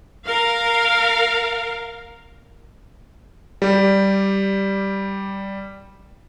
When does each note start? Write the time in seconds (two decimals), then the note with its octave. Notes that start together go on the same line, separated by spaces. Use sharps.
0.24 A#4 F5
3.62 G3 G4